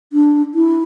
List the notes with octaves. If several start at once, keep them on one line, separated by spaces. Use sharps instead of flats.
D4
E4